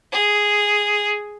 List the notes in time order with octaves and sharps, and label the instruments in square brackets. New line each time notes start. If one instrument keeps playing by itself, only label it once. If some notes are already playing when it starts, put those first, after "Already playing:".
[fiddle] G#4